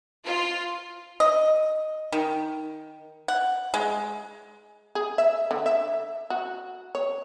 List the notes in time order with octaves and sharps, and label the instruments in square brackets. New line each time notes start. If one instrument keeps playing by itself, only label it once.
[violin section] F4
[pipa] D#5
D#3
F#5
G#3
[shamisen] G#4
E5
D3
E5
F#4
C#5